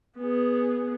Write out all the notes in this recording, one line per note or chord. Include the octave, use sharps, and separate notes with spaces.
B3 G#4